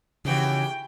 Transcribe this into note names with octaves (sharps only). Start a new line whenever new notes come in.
D#2 C#3 E3 F#4 G5